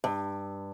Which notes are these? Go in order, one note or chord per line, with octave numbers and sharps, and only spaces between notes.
G2